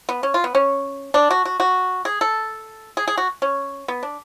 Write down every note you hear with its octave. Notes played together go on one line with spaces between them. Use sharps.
B3
C#4
F4
B3
C#4
D4
F#4
F#4
F#4
G#4
A4
G#4
G#4
F#4
C#4
B3
D4